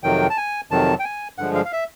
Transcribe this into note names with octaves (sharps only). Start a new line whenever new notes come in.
F2 C3 D#3 F#3 G5
A5
G#5
F2 C3 D#3 F#3 A5
G5
G#5
G2 D3 F3 G#3 F#5
F5
F5
E5